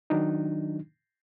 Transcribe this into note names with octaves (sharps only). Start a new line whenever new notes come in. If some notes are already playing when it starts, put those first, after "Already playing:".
D#3 F#3 D4 D#4